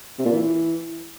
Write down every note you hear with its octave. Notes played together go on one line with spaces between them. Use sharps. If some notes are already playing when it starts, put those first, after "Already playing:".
C3
A#2
E3